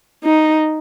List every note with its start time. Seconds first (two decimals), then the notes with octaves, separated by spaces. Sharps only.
0.24 D#4